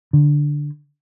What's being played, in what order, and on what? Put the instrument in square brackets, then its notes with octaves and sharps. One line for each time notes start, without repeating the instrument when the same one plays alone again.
[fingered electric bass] D3